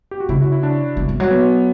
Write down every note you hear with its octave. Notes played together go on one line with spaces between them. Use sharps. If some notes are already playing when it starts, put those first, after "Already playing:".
G4
F#4
C#3 E4
F#4
E4
D4
C#3
E3
F#3
B3